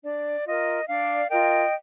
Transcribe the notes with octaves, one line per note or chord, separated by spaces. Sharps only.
D4 D5
F4 A#4 D#5
D4 D5 F5
F4 A#4 D#5 G5